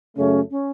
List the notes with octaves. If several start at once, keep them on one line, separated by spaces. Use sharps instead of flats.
F#2 C#3 A3 C#4
C#4